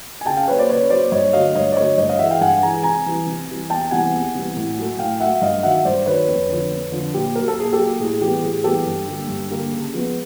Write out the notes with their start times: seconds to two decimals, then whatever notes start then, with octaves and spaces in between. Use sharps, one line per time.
0.21 G#5
0.26 C#3 G5 A5
0.37 F5 G5
0.48 F#3 A#3 B4 C#5
0.58 C5 D5
0.69 C#3 B4 C#5
0.90 F#3 A#3 C5 D5
1.12 G2 C#5 D#5
1.33 D3 F#3 A3 D#5 F5
1.55 G2 C#5 D#5
1.72 D5
1.76 D3 F#3 A3 C#5 D#5
1.98 G2 C#5 D#5
2.09 D#5 F5
2.19 E3 G#3 E5 F#5
2.31 F5 G5
2.41 G2 F#5 G#5
2.63 E3 G#3 G#5 A#5
2.83 C3 G#5 A#5
3.06 E3 G3
3.26 C3
3.48 E3 G3
3.70 E2 G5 A5
3.91 C3 E3 G3 B3 F#5 G#5
4.13 E2
4.35 C3 E3 G3 B3
4.56 A2
4.77 F#3 A3
4.98 A2 F5 G5
5.20 F#3 A3 E5 F#5
5.41 G2 D#5 F5
5.63 D#3 F#3 E5 F#5
5.85 G2 C5 D5
6.06 D#3 F#3 B4 C#5
6.28 F2
6.49 D3 F3
6.71 F2
6.92 D3 F3
7.14 A#2 G4
7.35 F#3 A#3 A#4
7.48 A4
7.57 A#2 G#4
7.73 G4 A4
7.79 F#3 A#3
8.00 A2 G#4
8.21 E3 G3 B3 G4
8.43 A2 G#4
8.64 E3 G3 B3 G4 A4
8.86 G2
9.08 D3 G3 A#3
9.28 G2
9.50 D3 G3 A#3
9.72 C#3
9.94 F3 G#3 B3